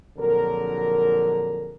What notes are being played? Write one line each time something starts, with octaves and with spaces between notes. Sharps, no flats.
A#1 F2 D3 F#3 G#4 A#4